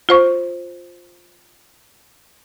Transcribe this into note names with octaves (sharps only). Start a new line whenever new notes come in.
F4 C5 C#6